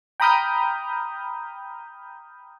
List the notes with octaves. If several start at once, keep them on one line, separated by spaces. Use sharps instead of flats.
G5 A#5 B5 D#6 F6 G6